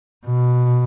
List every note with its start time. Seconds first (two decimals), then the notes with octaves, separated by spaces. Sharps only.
0.26 B2